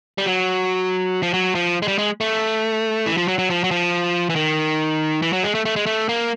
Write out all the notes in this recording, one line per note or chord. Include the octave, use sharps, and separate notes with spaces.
G3
F#3
F3
F#3
F3
G#3
G3
G#3
A3
E3
F3
F#3
F#3
F3
F#3
F3
E3
D#3
E3
F#3
G#3
A3
A3
G#3
A3
A#3